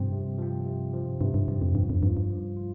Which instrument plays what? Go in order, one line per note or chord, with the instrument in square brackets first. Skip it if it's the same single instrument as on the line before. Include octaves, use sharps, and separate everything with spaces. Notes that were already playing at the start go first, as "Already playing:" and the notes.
Already playing: [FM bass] G2 [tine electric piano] C3 F3 C4
[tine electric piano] C3
F3 C4
C3
F3 C4
[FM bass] G2 [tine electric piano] C3
[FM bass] G2
[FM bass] G2 [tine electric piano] F3 C4
[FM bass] F2
[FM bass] G2 [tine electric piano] F3
[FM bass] F2
[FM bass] G2 [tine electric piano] C4 F4
[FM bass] G2
[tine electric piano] F3
F4